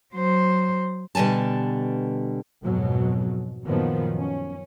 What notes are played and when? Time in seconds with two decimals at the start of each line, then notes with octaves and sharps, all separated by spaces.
0.14 F#3 C5
1.15 B2 D3 G3 G#5 A5
2.63 F2 G#2 B2 F#3
3.64 F#2 A#2 D#3 F3 F#3 B3
4.17 C#4